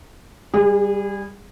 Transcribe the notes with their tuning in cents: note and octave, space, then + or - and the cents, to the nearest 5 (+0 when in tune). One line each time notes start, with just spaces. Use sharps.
G3 +15 G#4 -30